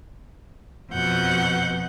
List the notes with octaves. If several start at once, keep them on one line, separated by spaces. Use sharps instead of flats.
F2 B2 F#5 G6